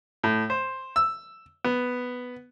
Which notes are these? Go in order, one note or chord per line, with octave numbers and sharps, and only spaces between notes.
A2
C5
E6
B3